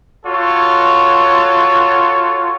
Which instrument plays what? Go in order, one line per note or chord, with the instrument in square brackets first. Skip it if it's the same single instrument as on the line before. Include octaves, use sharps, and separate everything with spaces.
[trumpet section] F4 F#4 A4 C#5